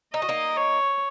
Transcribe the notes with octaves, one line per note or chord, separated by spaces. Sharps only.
D#4 D#5
F#4
A#3 D#4
C#5